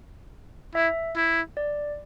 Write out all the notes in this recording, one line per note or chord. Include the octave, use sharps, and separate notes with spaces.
E4 E5
E4
D5